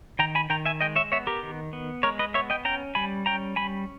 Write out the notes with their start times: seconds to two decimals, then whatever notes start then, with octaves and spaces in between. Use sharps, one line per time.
0.19 D#3 G5 A#5
0.35 G#5 B5
0.50 D#3 G5 A#5
0.65 E5 G#5
0.81 G#3 D#5 G5
0.96 C#5 E5
1.12 B3 C#5 E5
1.27 G4 A#4
1.43 D#3
1.73 B3
2.03 G#3 A#4 C#5
2.19 B4 D#5
2.34 B3 C#5 E5
2.50 D#5 G5
2.65 C#4 G5 A#5
2.95 G3 G#5 B5
3.26 C#4 G5 A#5
3.56 G3 G#5 B5